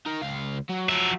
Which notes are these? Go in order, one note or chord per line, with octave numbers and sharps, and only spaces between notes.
D#4 A#4
C#2 F5
F#3
F3 F#3 E5